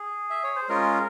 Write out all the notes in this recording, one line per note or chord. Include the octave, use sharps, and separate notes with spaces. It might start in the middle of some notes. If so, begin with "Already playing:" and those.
Already playing: G#4
E5
C#5
C5
G#3 C#4 F4 A#4